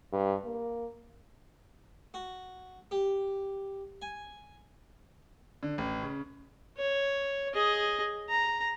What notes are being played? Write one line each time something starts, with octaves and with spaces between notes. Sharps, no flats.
G2
A#3
F#4
G4
G#5
D3
A1
C#3
C#5
G#4 D#5
A#5